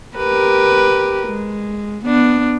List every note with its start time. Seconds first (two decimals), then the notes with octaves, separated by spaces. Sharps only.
0.17 G4 A#4 B4
1.28 G#3
2.05 B3 D4